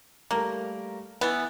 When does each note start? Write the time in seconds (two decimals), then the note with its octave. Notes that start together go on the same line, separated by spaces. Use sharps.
0.31 G3 A3 A#3 A#4
1.21 E3 B3 E4 A6